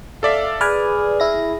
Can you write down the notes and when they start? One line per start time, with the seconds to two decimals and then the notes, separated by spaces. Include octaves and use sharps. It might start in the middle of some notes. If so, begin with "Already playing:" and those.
0.23 A4 D5 E5 F5
0.61 G#4 B4 D5 G#5 F6
1.20 E4 A#6